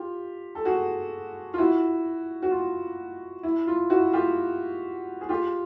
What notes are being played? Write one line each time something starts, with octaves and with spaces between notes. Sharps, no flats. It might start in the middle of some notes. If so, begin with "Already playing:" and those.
Already playing: F4 G4
A4
F#4 G#4
F4
E4 F#4
F#4
F4
E4
F4
E4 F#4
F4 G4
G#4
F4 G4